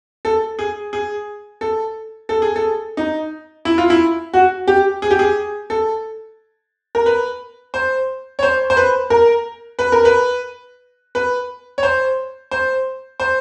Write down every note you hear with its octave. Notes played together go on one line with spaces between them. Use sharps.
A4
G#4
G#4
A4
A4
G#4
A4
D#4
E4
F4
E4
F#4
G4
G#4
G4
G#4
A4
A#4
B4
C5
C#5
C5
C5
B4
A#4
B4
A#4
B4
B4
C#5
C5
C5
C5